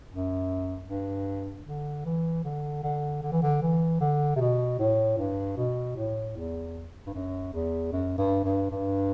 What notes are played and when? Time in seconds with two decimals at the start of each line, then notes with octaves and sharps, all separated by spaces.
0.09 F#2
0.88 G2
1.66 D3
2.05 E3
2.44 D3
2.83 D3
3.23 D3
3.32 E3
3.43 D3
3.62 E3
4.01 D3
4.36 C3
4.41 B2
4.79 A2
5.18 G2
5.57 B2
5.96 A2
6.36 E2
7.07 G2
7.14 F#2
7.53 E2
7.92 F#2
8.18 G2
8.44 G2
8.71 G2